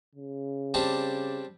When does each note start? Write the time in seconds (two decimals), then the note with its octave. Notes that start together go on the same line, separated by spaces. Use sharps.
0.15 C#3
0.74 G3 C4 D4